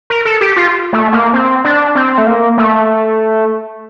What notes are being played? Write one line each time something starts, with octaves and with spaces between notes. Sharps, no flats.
A#4
A4
G4
F4
A3
A#3
C4
D4
C4
A3
A#3
A3